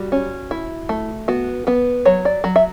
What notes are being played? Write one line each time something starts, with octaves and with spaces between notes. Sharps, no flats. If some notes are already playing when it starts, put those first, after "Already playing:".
Already playing: G3 F#4
C#4
E4
A3
B3 F#4
B3 B4
F#3 C#5
D5
F#3
E5